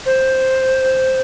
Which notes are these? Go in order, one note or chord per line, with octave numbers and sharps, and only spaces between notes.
C5